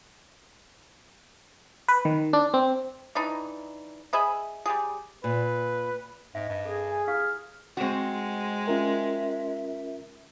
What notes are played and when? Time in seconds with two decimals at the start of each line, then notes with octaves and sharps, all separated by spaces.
1.88 B4
2.05 D#3
2.33 D4
2.54 C4
3.15 E3 D4 D#4
4.13 G#4 D#5 E5 B5
4.66 G3 G4 G#4
5.24 A#2 B4
6.35 G#2 D#5 E5
6.49 G2
6.66 G#4 A4
6.90 G#5
7.07 E4 G4 F5 F6
7.77 G#3 C4 F#4
8.68 C#4 F4 A#4 E5